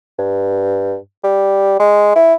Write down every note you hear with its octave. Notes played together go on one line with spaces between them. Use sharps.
G2
G3
G#3
E4